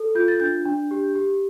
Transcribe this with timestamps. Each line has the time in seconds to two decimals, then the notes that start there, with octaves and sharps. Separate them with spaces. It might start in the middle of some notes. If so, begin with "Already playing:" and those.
Already playing: A4
0.15 F4 G6
0.28 A6
0.40 D4 G6
0.65 D4
0.91 G4
1.15 G4